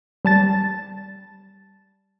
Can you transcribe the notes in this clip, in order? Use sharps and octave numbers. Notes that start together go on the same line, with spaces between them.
G3 A5 A6